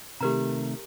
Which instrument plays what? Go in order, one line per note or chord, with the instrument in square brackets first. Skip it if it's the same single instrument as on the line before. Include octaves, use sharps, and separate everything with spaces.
[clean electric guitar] C3 D#3 A3 [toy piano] G4 A#4 A#5